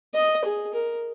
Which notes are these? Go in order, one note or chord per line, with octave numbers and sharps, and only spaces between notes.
D#5
G#4
A#4